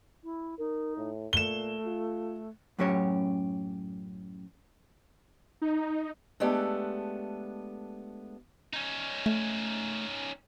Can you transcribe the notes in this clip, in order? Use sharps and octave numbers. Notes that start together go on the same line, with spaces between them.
E4
D#4 A#4
A2
A#2 A3 E7 G7
F4
F#2 A2 F#3 C#4 G4 C#5
D#4
G#3 A3 B3 D4 G4 A4
C#4 D#4
A3